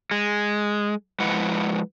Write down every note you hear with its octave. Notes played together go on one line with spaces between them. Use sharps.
G#3
F3 G#3 E4 B4 D#5 F#5